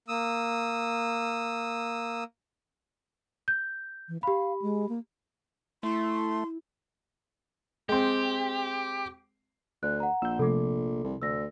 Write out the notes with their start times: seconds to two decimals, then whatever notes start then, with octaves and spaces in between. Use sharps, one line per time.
0.08 A#3 D#6 E6
3.48 G6
4.09 E3
4.23 G4 F5 B5
4.62 G#3
4.89 A#3
5.83 A3 E4 C6
7.89 G#3 C4 G4
9.83 D2 F#6
10.00 F#5 A#5
10.22 A#1 E6 G6
10.39 C3 F3 A3 A4 D6
11.04 C2
11.22 D2 E6 A#6